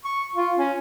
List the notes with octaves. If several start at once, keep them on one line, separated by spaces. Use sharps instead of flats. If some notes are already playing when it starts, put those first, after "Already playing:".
C#6
F4
C#4